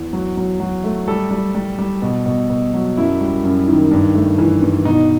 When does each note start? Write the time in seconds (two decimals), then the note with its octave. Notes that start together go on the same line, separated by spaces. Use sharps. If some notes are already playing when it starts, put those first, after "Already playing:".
Already playing: E2
0.13 F#3
0.37 F#3
0.60 F#3
0.84 A3
1.08 G3 A4
1.31 G3
1.54 G3
1.79 G3
2.02 B2
2.26 B2
2.50 B2
2.74 F#3
2.97 F#2 E4
3.21 G3
3.43 F#2
3.68 D#3
3.91 G2
4.15 A3
4.38 E3
4.62 G2
4.85 B2 D#4